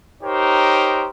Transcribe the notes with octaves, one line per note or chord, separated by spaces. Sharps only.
D#4 G4 A#4 C5 C#5